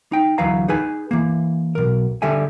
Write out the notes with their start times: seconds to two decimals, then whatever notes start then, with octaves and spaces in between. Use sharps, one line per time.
0.12 D#4 G5
0.38 D2 E3 F#3 B4 F5 A#5
0.68 D#4 G#4 B4 G#5
1.11 E3 A#3
1.75 B1 A#4
2.22 D3 G3 A4 E5 G#5